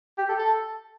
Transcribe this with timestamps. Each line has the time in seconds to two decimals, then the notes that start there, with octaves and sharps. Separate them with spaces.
0.18 G4
0.29 A4
0.39 A4